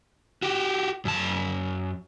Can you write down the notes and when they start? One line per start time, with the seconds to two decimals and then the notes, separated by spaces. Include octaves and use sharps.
0.43 F#4 G4
1.05 F#2 A5